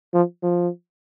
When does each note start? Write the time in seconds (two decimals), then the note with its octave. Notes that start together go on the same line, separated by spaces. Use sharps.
0.14 F3
0.43 F3